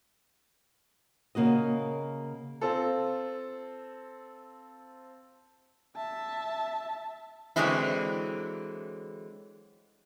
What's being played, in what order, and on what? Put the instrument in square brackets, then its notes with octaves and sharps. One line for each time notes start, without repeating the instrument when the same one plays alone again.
[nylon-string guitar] C#3 A#3 F#4 D#5
[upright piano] C4 F4 A4
[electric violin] E5 A5
[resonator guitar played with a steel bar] D3 E3 F#3 G#3 C4 E4